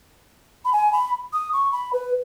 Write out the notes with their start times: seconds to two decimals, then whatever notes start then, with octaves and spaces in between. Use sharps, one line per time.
0.65 B5
0.73 G#5
0.93 B5
1.33 D#6
1.53 C#6
1.72 B5
1.93 B4